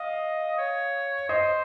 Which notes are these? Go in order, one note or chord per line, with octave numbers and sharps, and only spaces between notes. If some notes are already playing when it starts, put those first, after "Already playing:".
Already playing: D#5 F5
C#5
C5 D#5